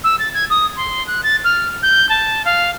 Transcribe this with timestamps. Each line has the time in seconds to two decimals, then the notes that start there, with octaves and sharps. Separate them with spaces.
0.04 E6
0.19 A6
0.34 G#6
0.50 D#6
0.77 C6
1.07 F#6
1.23 A6
1.44 F6
1.83 G6
2.09 A5
2.45 F5